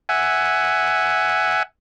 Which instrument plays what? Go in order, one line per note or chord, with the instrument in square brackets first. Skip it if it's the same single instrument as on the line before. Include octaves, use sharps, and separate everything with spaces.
[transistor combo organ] E5 F#5 G#5